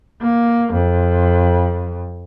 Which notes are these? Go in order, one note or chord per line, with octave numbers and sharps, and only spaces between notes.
A#3
F2